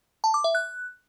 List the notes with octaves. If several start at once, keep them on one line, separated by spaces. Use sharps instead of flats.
A5
D6
E5
F#6